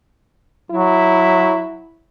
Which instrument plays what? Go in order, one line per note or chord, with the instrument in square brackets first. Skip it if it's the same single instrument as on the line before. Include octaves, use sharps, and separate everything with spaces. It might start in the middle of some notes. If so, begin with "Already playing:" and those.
[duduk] F#3 [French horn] E4